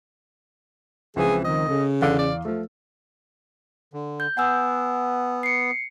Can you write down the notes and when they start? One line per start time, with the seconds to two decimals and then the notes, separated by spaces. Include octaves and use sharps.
1.16 C#2 E3 F3 C4 G#4
1.45 D#3 D#5
1.69 C#3 A4
2.02 E2 D3 F5 D6
2.19 D5
2.45 F3 A3
3.93 D3
4.20 G6
4.37 B3 F#5 G#5 E6
5.43 C7 C#7